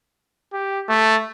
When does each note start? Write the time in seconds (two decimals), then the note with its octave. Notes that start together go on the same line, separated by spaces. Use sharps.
0.53 G4
0.88 A3